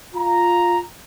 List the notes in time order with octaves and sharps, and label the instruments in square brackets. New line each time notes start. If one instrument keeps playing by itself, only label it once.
[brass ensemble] F4 A#5